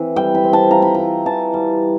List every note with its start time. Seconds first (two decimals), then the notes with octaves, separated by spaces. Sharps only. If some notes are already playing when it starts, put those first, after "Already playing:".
Already playing: E3 C4
0.16 G3 G5
0.35 B5
0.44 C4
0.53 A5
0.71 F4 A#5
0.82 B5
0.94 E3 A#5
1.26 E3 A5
1.54 G3